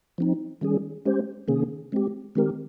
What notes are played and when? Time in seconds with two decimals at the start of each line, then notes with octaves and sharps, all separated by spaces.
0.18 F3 C4 D#4
0.61 D#3 G3 C#4 G#4
1.05 G#3 C#4 G4 C5
1.48 C3 D#3 A#3 C#4 G#4
1.92 G#3 C4 G4
2.35 D#3 G#3 C4 G4 A#4